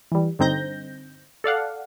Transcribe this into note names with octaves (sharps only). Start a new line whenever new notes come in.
E3 G3
G2 D3 C4 D#4 G6 A#6
A4 D5 F5 F#5